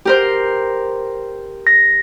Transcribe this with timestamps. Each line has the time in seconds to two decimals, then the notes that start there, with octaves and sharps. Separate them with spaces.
0.05 G4 A#4 C5
1.67 A#6